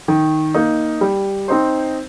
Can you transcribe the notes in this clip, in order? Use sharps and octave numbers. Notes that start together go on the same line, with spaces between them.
D#3
A#3 D#4
G3
C4 D#4 C5